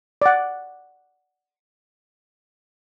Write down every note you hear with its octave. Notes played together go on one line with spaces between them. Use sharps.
D5 F#5